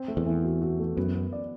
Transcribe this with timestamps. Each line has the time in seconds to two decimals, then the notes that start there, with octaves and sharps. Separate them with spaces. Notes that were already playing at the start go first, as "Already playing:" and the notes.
Already playing: C4
0.08 A3
0.17 E2
0.26 E3
0.44 F#4
0.62 F#4
0.79 A3
0.97 F#2 B3
1.15 B3
1.32 D5